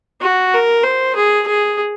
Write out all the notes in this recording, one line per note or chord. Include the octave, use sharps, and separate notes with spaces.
F#4
A#4
C5
G#4
G#4